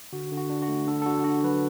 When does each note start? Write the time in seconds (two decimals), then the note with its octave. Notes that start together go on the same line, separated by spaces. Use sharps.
0.13 D3 F#4
0.32 D3
0.37 F#4
0.50 D4
0.62 F#4
0.69 A3
0.87 D3 A4
1.02 A4
1.06 D3 F#4
1.24 D4 F#4
1.43 F#3 B4